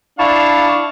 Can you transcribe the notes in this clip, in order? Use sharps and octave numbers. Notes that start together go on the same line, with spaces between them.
D4 E4 F5 A5 C#6